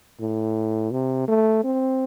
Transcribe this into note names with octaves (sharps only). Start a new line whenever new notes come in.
A2
C3
A3
C4